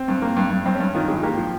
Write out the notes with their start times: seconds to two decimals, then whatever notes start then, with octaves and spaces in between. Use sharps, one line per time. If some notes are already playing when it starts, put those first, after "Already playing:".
Already playing: C4
0.08 G2
0.22 A#3
0.36 G2
0.51 G2
0.65 G2 C4
0.75 C#4
0.80 G2
0.94 D#3 F4
1.08 G2 G#4
1.23 A#3 G4
1.37 F3